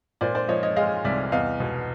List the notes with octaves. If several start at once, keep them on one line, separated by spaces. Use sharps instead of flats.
A#2 C5 D5
C5 D5
F3 C#5 D#5
C#5 D#5
G#3 D#5 F5
C2 D5 E5
E2 D#5 F5
B2